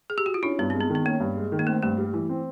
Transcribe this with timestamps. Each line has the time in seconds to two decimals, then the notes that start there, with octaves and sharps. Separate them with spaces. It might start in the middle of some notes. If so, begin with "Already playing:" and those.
0.10 G#4
0.18 G4
0.26 F#4
0.34 F4
0.43 C#4 D4 E4
0.59 G2 B3
0.70 G#3 C4
0.80 B3
0.90 D#3
0.95 B3
1.05 A#3 C#4
1.20 G2
1.37 G#3
1.52 D#3
1.59 A#3
1.67 A3 C4
1.82 G2 A3
1.98 G3
2.14 E3
2.29 C4